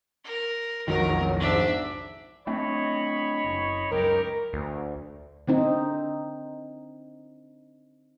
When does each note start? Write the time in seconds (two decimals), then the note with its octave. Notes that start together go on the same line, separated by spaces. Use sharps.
0.24 A#4
0.88 B1 F2 D#3 F#3 A#4
1.40 G#2 D4 E5
2.47 A3 C4 D4 C#5 D#5 B5
3.44 F#1
3.92 C#2 F#2 D#4 G4 A#4
4.53 D2
5.47 D3 C4 D#4